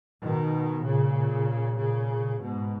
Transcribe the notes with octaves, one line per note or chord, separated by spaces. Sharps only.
B2 D#3
A#2 C#3
A#2 C#3
G#2 B2